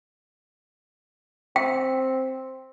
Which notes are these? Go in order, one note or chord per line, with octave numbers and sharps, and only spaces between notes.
C4 G5